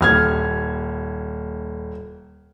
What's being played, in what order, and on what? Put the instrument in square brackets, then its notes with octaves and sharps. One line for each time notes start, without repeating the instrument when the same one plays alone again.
[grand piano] D#1 F6 G#6